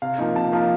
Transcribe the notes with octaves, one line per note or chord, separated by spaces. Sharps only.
C3 F5
F3 A#3 D#4
C3 A5
F3 A#3 D#4